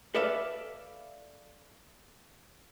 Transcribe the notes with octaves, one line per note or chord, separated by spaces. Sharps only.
A4 B4 D5 E5 F5